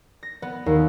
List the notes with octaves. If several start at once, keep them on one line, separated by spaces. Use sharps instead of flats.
A#6
B3
D#2